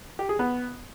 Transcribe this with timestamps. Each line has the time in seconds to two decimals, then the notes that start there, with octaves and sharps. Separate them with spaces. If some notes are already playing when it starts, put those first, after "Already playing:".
0.19 G4
0.29 G#4
0.39 B3